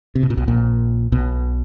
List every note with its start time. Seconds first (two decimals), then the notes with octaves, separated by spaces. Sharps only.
0.15 C3
0.23 B2
0.30 A#2
0.37 B1 B2
0.48 A#1 A#2
1.12 B1 B2